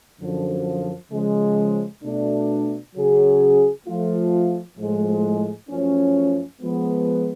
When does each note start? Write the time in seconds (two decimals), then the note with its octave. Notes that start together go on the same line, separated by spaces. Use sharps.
0.19 F#2 D3 F3
1.11 C#3 F3 G#3
2.02 B2 A3 D4
2.94 C#3 F#3 C#4 G#4
3.86 F3 A3 F4
4.78 A2 F3 G#3
5.69 F#2 F3 A3 C#4
6.60 F3 G#3 B3